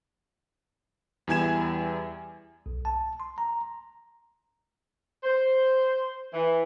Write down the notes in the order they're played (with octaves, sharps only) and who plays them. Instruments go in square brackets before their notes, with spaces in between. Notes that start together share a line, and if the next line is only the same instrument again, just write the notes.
[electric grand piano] E2 G3 E4 G#5 G#6 E7
[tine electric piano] B1
A5
C6
A#5
[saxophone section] C5
E3